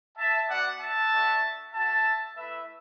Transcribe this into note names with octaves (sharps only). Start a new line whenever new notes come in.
E5 A5
B3 F#4 D5 F#5
E5 A5
A3 D4 F#4
A3 F#4 E5 A5
A3 E4 B4 E5